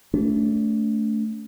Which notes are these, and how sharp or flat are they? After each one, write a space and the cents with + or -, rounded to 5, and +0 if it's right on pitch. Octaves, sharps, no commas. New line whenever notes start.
A3 +0 D4 -45